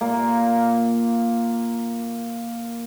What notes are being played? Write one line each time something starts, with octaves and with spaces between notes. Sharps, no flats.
A#2 A#3